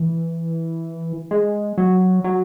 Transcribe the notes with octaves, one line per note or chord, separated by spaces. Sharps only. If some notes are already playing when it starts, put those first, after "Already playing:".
Already playing: E3
G#3
F#3
F#3